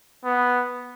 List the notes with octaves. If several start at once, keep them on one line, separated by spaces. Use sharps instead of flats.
B3